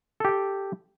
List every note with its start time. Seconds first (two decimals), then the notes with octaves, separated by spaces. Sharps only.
0.20 A4
0.25 G4
0.29 G5